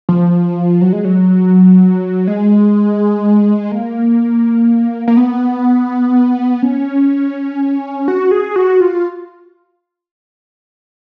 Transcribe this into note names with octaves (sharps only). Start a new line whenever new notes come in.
F3
F#3
G#3
F#3
G#3
A#3
A#3
B3
C#4
F#4
G#4
F#4
F4